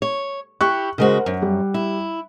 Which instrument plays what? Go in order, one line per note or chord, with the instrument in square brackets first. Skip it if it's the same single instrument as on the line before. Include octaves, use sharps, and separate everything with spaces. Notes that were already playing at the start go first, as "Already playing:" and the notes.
[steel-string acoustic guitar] C#5
[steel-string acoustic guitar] E4 G4 [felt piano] C#6 F#6
[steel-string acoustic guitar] C#3 G#3 F#4 [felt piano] A#4 C5
[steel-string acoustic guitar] F#2
[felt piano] G3
[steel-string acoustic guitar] E4